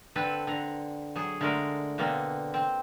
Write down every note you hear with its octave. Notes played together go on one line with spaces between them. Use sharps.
D3 C4 A4 B4
D3 A#5
F#3 G#4
D3 G#3 A3 A#4
B2 D3 A#3 C4
C4